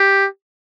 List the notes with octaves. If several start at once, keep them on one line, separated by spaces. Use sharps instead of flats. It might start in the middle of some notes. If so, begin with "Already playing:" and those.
Already playing: G4